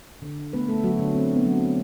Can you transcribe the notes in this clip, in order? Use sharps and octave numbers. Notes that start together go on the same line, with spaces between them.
D3
A3 B3 B4
A3 A4
D3 F#3 F#4
D3 D4
D3 C4
B3
F#3
C4